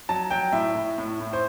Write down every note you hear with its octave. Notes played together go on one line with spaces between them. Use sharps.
F#3 A5
F#3 G5
A2 E5
A2
A2
A2
C5